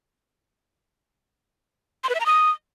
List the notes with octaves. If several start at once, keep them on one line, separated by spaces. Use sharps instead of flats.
C6
B4
E5
A#5
D#6